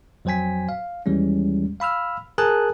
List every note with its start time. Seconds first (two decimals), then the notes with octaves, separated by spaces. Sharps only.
0.25 F2 F#3 C5 G5 G#5 B6
0.69 F5
1.06 D#2 E3 G3 G#3 C#4
1.80 F5 B5 E6 F6
2.38 G#4 A#4 G#5 A5 D#6 F#6